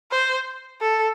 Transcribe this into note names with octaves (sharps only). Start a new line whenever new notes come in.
C5
A4